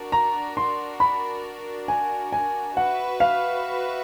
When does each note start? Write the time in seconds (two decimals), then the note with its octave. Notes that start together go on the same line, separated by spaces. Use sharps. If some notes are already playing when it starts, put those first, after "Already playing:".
Already playing: D4 F#4 A#4 D5
0.12 A#5
0.57 C6
1.00 B5
1.88 G#5
2.33 G#5
2.76 F#4 B4 E5 F#5
3.20 F5